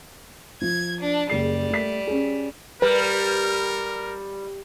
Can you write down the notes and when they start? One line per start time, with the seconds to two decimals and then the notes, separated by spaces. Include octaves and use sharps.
0.62 F3 G#6
0.99 D4
1.30 F#1 G3 G#4 C7
1.70 A3 B6
2.07 C#4 G#4
2.82 G3 A#4 B4